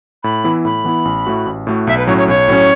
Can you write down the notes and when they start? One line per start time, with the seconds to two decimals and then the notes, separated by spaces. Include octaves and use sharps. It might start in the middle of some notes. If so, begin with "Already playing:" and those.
0.23 A2 B5
0.44 E3 B3 E4
0.65 A2 B5
0.84 E3 B3 E4
1.05 A1
1.26 A2 A3 F#4
1.46 A1
1.67 A2 A3 F#4
1.87 B1 E5
1.97 B4
2.07 A2 F#3 C#4 C#5
2.17 C#5
2.28 B1 C#5
2.48 A2 F#3 C#4